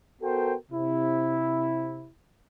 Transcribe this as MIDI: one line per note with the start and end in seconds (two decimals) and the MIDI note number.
0.22 0.54 59
0.22 0.54 66
0.22 0.54 69
0.22 0.54 70
0.22 0.54 72
0.22 0.54 79
0.72 2.10 48
0.72 2.10 64